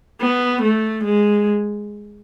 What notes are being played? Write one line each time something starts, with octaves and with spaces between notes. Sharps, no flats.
B3
A3
G#3